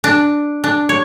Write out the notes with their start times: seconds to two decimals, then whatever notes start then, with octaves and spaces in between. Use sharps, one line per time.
0.04 D4
0.64 D4
0.89 C#5